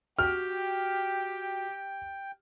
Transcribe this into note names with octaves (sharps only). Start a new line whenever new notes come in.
F#4 G4 G5 F6